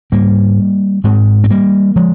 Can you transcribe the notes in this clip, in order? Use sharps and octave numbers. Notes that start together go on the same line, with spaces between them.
G#2 G3 A#3
G#2 G#3 C4
C4
G3 A#3
F3 G#3